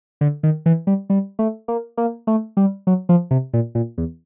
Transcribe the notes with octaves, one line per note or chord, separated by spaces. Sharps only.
D3
D#3
E3
G3
G3
A3
A#3
A#3
A3
G3
F#3
F3
C3
A#2
A#2
E2